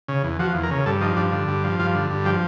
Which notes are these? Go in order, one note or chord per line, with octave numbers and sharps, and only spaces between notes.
C#3
E2
F3 F#4
E2
A#4
C#3
G2 A4
F3 D#4
G2 D4
D3
G2
F3
G2 F4
D3
G2
F3 G4